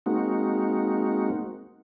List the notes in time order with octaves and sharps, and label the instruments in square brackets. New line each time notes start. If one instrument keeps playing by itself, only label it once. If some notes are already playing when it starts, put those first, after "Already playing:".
[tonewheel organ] G#3 A#3 C4 D#4 F#4